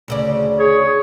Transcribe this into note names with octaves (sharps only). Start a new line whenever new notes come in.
D2 C#3 D5
G#4 C#5